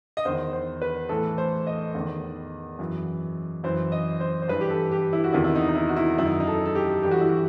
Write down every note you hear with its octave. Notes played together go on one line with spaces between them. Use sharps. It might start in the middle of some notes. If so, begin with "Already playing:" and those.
D#5
E2 D#3 C5
C5
B4
A2 E3 A4
C5
D#5
E2 D#3
F#2 E3
F#2 E3 C5
D#5
C5
C5
G2 E3 B4
G4
A4
G4
E4
F#4
E2 C3 D#3 E4
E4
D#4
D#4
E4
F#4
E4
F#2 D#3 E4
D#4
D#4
A4
A4
G4
G2 E3 G4
F#4
E4
F#4